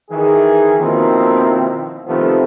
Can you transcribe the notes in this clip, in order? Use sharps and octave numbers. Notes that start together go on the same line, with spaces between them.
D#3 E3 G#4
B2 D#3 F3 A#3 C4 E4
C3 D#3 F3 A3 B3 C4